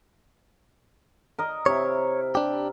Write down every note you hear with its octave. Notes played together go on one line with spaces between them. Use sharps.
A#4 D#5
C3 E4 C#5
D4 G4